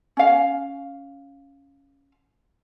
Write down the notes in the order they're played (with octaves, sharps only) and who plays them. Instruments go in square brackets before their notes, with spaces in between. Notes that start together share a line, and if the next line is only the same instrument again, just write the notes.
[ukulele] C#4 F5